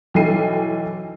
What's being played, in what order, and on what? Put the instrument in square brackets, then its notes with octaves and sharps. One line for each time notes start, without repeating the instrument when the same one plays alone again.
[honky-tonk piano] B1 E3 A4 G5 C7 D#7